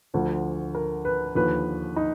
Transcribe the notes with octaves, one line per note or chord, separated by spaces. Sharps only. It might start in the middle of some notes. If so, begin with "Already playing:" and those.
D2 D3 F3
A#4
B4
D#2 D3 F3 B4
D#4